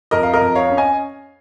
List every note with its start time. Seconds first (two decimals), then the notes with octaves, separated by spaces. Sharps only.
0.11 F2 A#4 D#5
0.23 F5
0.33 A#4 D#5
0.41 F2
0.55 C#5 F5
0.70 C#4
0.77 D#5 G#5